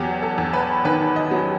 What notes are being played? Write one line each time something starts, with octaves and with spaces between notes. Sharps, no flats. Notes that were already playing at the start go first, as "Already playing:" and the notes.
Already playing: E2 F#3 F#4 G4
A4
E2
B4
D#3 B4
D#5
F#3